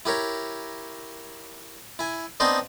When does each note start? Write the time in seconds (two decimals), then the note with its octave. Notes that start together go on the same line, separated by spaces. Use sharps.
0.05 E4 G4 A#4 C#5
1.99 E4 G#5
2.40 B3 C4 D4 D#4 C5 D#5